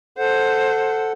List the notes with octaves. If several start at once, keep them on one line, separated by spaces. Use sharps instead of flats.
A4 C5 F#5